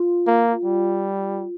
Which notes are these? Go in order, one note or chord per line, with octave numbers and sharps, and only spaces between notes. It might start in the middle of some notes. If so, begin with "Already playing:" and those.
Already playing: F4
A#3
G3